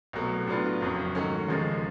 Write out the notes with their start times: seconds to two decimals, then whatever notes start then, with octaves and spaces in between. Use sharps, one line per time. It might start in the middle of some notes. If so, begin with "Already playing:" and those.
0.13 C2 B2 F#3 A3
0.47 A2 F#3 B3 D4 F4
0.81 F#1 F2 C#3 F#3
1.15 G#2 D#3 F#3 A3 C#4
1.48 E1 D#2 C#3 F3 G#3